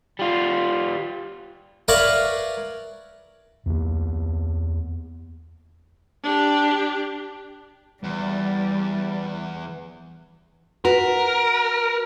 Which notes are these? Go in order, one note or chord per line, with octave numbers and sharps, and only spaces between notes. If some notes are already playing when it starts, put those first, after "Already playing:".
G3 F4
A#4 B4 C#5 D5 E5 F5
E2 A#3
D4 G4
E2 G3
F#4 A#4 B4